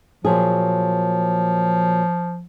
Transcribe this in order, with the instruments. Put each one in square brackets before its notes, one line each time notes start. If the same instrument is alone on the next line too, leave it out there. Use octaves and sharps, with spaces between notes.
[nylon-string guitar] A#2 F#3 G#4 [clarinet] F3